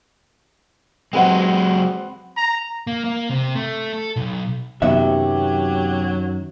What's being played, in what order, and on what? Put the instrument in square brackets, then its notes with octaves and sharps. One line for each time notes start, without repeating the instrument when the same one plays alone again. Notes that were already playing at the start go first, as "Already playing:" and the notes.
[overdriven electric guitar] F#3 G#3 [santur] C4 B4 F#5
[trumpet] A#5
[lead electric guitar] A#3
A#3
C3
A3
A4
B1
[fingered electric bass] F#2 D#3 [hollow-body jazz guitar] C3 B3 E5 [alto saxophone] F#3 [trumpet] G4